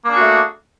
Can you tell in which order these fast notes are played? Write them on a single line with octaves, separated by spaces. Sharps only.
A#3 D4 G#4 F#4 A3